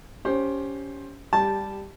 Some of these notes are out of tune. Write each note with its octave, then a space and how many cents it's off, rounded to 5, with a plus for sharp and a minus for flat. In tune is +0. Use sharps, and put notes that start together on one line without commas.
C#4 +20 G4 +0 C5 +20
G3 +15 G4 +0 A5 -5